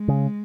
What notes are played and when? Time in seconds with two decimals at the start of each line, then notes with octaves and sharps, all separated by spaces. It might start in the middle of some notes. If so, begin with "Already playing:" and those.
Already playing: G#3
0.08 C#3